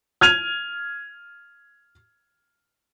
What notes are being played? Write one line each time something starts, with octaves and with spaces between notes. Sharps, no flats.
F6 G#6 D#7 F7